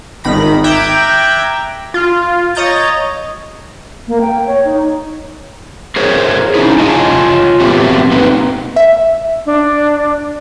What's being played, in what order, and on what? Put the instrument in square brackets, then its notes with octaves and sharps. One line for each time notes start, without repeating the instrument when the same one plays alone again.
[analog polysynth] G#1 D#3 B5 A#6
E5 G5 A#5 D6 F#6 G#6
F4
C#5 D#5 A#5 G6 A6
[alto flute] A#3
G5
C#5
D#4
[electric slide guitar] G#4 A#4 C5 C#5
C#4 D#4 E4 G#4
F4 C#5 D#5 G#5 A5
F#3 A3 B3 C4 G4
A#3 C4 D#4 B4
[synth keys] E5
[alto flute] D4